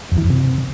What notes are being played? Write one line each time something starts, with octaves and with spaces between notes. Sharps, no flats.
F2
E3
F2
C3